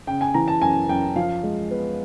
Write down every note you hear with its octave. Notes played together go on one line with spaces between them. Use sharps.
C#3 G5
G#5
E3 A#5
A5
F#2 G#5
F#2 G5
F3 F5
G#3
B3